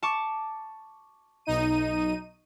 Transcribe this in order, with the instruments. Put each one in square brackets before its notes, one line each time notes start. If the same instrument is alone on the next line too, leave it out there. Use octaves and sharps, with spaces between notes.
[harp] A5 C#6 D6
[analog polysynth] B1 D#4 D#7